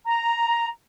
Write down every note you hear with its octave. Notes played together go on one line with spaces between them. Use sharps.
A#5